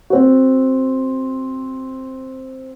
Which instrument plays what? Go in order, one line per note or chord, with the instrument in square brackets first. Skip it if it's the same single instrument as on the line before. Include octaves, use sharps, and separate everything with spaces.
[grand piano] C4 F#4